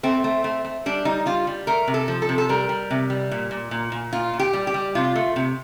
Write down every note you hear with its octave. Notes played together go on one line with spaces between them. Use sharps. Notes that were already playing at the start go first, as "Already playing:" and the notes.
A3 C4
A3
A3
A3
G3 D4
G3 D#4
G3 F4
G3
A3 A#4
C3
A4
F3
A4
C3
A4
G3 A#4
G3
C3
G3
A#2
A#2
A#2
A#2
A#2 F4
A#2
G4
G3
G4
G3
C3 F4
A3
C3